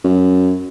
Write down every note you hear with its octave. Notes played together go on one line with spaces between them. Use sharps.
F#2